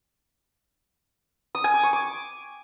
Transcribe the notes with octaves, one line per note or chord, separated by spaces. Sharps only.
D#6
G#5
D6
C#6
D6